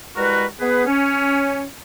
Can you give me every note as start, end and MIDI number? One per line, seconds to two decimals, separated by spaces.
0.16 0.45 55
0.16 0.45 56
0.16 0.45 64
0.16 0.45 66
0.16 0.45 70
0.16 0.45 71
0.60 0.85 59
0.60 0.85 68
0.60 0.85 71
0.87 1.64 61